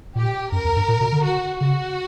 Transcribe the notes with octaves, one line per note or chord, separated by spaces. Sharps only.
A#2 G4
F#2 A#4
E2
G2
A#2
B2
D3
F#4
C#3 F#4